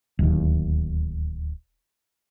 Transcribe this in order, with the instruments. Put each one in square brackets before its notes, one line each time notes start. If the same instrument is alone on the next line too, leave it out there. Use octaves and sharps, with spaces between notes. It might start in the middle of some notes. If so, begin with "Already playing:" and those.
[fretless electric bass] D1 D#2